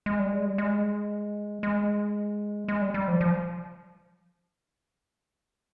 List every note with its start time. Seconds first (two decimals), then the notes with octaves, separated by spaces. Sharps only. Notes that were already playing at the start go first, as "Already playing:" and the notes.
0.06 G#3
0.19 G3
0.33 G#3
0.46 G3
0.58 G#3
1.63 G#3
2.68 G#3
2.82 G3
2.94 G3
3.08 F3
3.21 F3